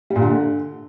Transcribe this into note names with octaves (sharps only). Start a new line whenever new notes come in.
G3
A#2
D3